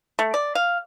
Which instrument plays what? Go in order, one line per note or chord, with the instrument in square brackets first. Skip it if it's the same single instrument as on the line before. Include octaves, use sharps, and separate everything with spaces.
[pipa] A3
D5
F5